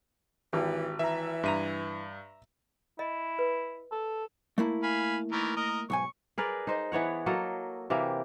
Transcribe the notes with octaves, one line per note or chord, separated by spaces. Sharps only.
G#1 E3 G4
E3 E5 A#5
G2 E5 A#5 D#7
E4 D#5
B4
A4
A3 A#3 E4
F5 G#5 B5
D#3 E3 A#4
A#4 D#5
B1 G#2 G#5 C#6
G#4 A#4 B4 D5
D#4 C5 D#5
E3 B3 C#5 F#5
F#3 A#3 A4 D#5
C3 E3 A#3 G4